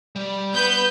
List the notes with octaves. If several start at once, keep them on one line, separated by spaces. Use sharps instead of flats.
G3
B3 B4 B5 G6